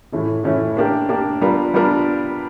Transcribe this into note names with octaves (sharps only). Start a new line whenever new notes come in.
A2 E3 A3 C#4 E4
A2 E3 A3 C#4 E4
A#3 D4 G4 A#4
A#3 D4 G4 A#4
G3 B3 D4 F4 A#4
G3 B3 D4 F4 A#4